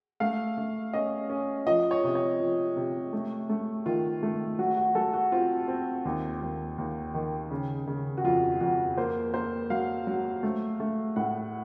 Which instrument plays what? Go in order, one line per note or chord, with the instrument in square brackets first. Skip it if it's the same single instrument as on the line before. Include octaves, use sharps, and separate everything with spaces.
[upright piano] A3 F5
A3
C#4 D#5
C#4
F3 D#5
C#5
C3
C#5
F3
C3
A3
A3
D#3 F4
A3
F#3 F#4
F#4
F#3 A4
F#4
C4 F4
C4
D#2
D#2
D#2
D#3
C#3
C#3
F#4
F2 F4
F2 F#4
A#3 C5
A#3 C5
F#3 F5
F#3
A3
A3
A2 F#5